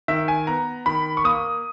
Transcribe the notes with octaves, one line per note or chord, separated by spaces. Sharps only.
D#3 E5
G#5
B3 A#5
D#3 B5
C#6
A#3 D#6